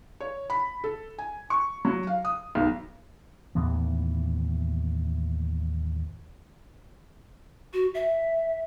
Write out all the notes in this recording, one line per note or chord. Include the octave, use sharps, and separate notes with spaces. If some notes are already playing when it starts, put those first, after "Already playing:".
C#5
B5
A4
G#5
C#6
F#3
F5
D#6
B1
D#2 A2 E3 B3
F#4
E5